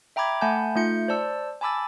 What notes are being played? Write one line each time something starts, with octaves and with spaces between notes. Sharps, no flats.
E5 G5 A#5 B5 D6 G#6
A3 F#5 G#5 A5 B5 G6
A3 D#4 F4 G6 C#7
C5 D5 A5 E6
G#5 A5 B5 D6 E6 A6